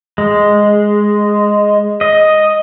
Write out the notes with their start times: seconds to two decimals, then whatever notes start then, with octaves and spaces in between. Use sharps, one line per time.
0.18 G#3
2.01 D#5